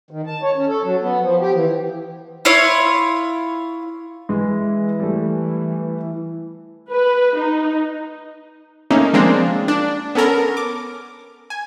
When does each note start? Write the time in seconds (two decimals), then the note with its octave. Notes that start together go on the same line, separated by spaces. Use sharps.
0.11 D#3
0.27 A5
0.43 C#5
0.56 C#4
0.68 A4
0.84 F#3
1.01 B3
1.21 F3
1.40 G4
1.53 E3
2.45 E4 F4 C#5
4.29 E3 G#3
4.99 G3 A3
6.91 B4
7.37 D#4
8.90 A3 A#3 C#4 D#4
9.13 F3 G#3 A#3 C4 D4
9.68 D4
10.15 B3 C#4 A4 A#4
10.57 D6
11.50 G#5